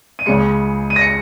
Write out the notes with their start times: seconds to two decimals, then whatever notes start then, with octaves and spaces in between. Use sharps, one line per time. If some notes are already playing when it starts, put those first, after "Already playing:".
0.19 D#7
0.26 C#2 C#3 G#3 C#7
0.90 D#7
0.96 A#6
1.01 C#7